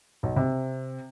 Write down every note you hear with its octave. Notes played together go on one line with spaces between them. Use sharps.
B1
C3